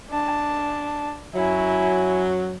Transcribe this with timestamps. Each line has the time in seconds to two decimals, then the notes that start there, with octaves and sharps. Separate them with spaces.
0.10 D4 A5
1.35 F#2 F#3 E4 G#5